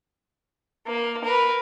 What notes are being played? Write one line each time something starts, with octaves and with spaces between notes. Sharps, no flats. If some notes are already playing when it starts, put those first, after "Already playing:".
A#3
A#4 B4